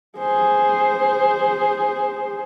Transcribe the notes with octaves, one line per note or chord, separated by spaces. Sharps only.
G#4 C5